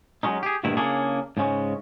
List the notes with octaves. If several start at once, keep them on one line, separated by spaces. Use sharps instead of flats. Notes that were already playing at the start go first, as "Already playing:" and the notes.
F#3 G#3 C#4 D#4
G4 G#4
D2 G2 A#2 D#3 E4
C#3 A#3 C#4 D4 E4 G#4
G#2 C#3 G#3 C#4